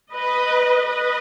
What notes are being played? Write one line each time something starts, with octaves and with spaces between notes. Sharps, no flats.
B4 D#5
B4 D#5